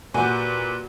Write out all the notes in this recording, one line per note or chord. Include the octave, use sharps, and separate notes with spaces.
A#2 F#4 G4 B4 G#5